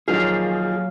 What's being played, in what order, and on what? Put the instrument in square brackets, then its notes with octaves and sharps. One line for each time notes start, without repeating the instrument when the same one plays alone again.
[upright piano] A#2 D#3 F3 [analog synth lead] F#3 [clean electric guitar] G#4 [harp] F5